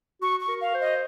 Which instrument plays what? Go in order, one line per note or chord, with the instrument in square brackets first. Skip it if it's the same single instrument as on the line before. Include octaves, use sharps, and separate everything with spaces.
[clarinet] F#4 [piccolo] C#6
[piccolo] C#6
[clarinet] A#4
[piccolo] F5
[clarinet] C5
[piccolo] D#5